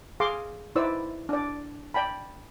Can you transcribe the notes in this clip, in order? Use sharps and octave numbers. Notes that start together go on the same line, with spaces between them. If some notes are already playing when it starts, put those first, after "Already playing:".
G#4 F5 C6 D6
D#4 E4 B4 C5 D5 E6
D4 D5
D5 G5 A5 B5